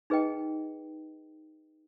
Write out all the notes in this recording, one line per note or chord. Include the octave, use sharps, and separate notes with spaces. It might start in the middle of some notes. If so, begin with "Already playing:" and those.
D#4 G#4 B4 D#5 G5